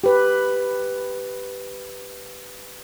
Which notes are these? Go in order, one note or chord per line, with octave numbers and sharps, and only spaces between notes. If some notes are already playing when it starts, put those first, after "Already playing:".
G4 B4